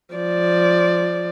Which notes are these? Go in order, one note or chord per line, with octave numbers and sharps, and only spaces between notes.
F3 D5